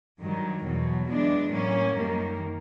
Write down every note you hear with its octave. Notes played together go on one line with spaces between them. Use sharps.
G2 D#3 F#3
E2 B2 F#3
E3 G#3 B3 D4
A2 F#3 A#3 C#4
F#2 D#3 G3 A#3